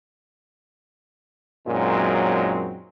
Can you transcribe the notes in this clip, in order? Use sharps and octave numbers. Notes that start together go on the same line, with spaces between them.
F#2 A#2 F#3 G#3 C4 D#4